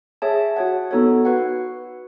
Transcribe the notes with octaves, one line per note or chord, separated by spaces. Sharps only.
G#4 C#5 E5 A5
F#4 C#5 F#5
B3 D#4 F#4 A4 C#5
F#4 B4 F#5